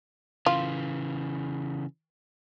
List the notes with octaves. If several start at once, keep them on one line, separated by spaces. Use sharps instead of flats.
C#3 E3 F4